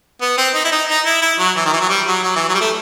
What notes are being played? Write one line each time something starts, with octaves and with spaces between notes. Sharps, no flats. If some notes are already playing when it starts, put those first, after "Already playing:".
B3
C4
D#4
E4
D#4
D#4
E4
E4
F#3
E3
D#3
E3
F#3
G3
F#3
F#3
E3
F#3
G3
A3